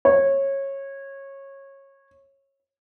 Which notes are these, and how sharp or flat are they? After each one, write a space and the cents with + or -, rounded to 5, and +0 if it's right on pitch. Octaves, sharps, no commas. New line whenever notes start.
C#5 -20